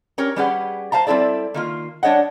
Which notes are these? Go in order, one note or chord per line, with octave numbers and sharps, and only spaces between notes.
C#4 G4 A#4 C#5
G3 C#4 G4 G#4 B4 F#5
C5 F5 A5 A#5
G3 C4 E4 A4 D5
D#3 A#3 F4
G3 D4 C#5 D#5 F#5